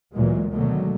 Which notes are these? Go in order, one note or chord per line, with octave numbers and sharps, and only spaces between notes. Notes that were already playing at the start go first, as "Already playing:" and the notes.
D2 A#2 E3 F#3 G#3
B2 D3 D#3 F#3 G#3 A3